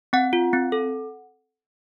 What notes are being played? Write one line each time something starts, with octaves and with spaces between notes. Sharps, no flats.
C4 F#5
F4
C4
A4